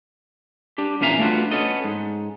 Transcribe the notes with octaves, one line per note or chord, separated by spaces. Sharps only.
D4 G4
E2 A#2 C#4 E5 F5 A#5
A3 B3 D4 F4 F#4
B3 C#4 A4 D#5
G#2